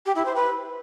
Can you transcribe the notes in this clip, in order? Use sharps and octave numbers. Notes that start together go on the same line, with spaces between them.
G4
E4
C5
B4